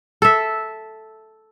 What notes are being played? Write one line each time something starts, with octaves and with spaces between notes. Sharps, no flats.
A4 E5